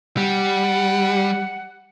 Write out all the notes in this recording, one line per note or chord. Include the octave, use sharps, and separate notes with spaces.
G3 F#5